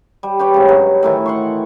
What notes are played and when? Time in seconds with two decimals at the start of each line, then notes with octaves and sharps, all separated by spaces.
0.23 G3
0.39 G4 B4 C#5 G5
0.54 G#2 C#3
0.68 G2 F#3
1.03 A2 D#3 E3
1.26 F#5 C6 C#6